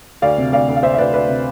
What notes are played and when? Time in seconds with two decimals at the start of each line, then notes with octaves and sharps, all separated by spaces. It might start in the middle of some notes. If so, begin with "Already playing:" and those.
0.22 D2 D5 F5
0.38 C3
0.52 D2 D5 F5
0.69 D2
0.76 F5
0.83 D2 C5 E5
0.94 E5
0.98 D2 B4 D5
1.14 D2 B4 D5
1.28 C3